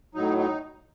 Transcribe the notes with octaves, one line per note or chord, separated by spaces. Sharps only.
A2 F#3 D#4
D#4